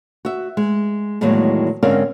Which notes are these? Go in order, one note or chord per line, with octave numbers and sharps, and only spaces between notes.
F#4 E5
G#3
E2 A2 D#3 F#3 G#3 A#3
G#2 D3 C4 C#4 A#4 F5